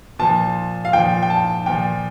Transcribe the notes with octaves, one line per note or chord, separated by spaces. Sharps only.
A#2 F3 A5
F5
A#2 F3 G5
G5
A5
A#2 F3 G5